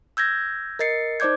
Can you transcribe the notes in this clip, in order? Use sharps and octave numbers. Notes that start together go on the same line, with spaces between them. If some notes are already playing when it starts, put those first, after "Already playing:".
E6 G6 G#6 A#6
A#4 D#5 A6 C7 C#7
D#4 C5 D5 D6 G6 G#6